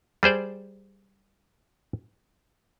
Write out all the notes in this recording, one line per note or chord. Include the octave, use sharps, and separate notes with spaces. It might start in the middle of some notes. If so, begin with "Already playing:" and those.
G3 G#4 C5 D5